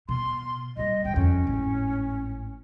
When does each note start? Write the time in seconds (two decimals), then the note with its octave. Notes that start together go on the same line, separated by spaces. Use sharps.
0.09 B2 C6
0.77 A#2 G3 D#5
1.04 G#1 D3 G5
1.16 F2 C#4
1.44 G#1 A2